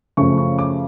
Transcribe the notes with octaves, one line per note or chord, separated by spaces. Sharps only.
F#2 C#3 F3 A3 C#6
C#6
D6